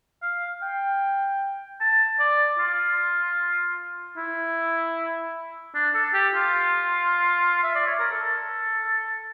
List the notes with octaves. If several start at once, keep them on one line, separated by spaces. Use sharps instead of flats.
F5
G5
A5
D5
F4
E4
D4
A4
G4
F4
E5
D5
C#5
A#4
A4